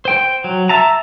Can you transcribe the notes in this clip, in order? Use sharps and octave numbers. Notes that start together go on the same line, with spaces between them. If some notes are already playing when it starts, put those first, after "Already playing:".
C5 G5
F#3
E5 A5 A#5